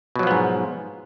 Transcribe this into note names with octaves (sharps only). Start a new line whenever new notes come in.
G#2 B2 F3 F#3 B3